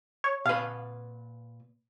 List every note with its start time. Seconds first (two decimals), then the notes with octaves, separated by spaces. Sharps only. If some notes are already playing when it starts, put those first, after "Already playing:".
0.24 C#5
0.46 A#2 B4 F5